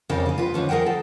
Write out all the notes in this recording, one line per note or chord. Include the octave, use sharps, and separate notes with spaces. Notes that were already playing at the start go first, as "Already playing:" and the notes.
F2 C#3 D4 G4 A#4 F5
A#3 G#4
F4 B4
G#2 D3 F3 C#4
G#4 A#4 C5 F#5 G5
A4